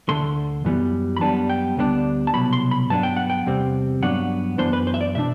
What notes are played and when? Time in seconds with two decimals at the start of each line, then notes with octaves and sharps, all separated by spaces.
0.09 D2 D3 A3 C6
0.65 F#2 E3 G3 B3
1.17 B5
1.21 F#2 E3 G3 B3 D4 A5
1.50 G5
1.77 D2 D3 G3 B3 D4
2.27 A5
2.34 C2 B2 F#3 B5
2.53 C6
2.71 B5
2.90 G2 F#3 B3 D4 A5
3.03 G5
3.17 F#5
3.30 G5
3.46 E2 C3 G3 C4
4.02 G2 F#3 B3 D4 F#5
4.58 F#2 E3 B3 D4 C5
4.73 B4
4.87 C5
4.94 E5
5.01 D5
5.15 B2 A3 D4 E5